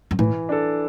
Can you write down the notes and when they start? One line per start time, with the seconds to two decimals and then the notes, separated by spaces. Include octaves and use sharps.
0.11 F#2
0.19 A2 E3
0.49 D4 A4